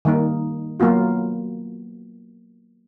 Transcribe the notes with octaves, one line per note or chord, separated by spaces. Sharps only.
D#3 G3 A#3 D#4
F#3 A#3 B3 F4 F#4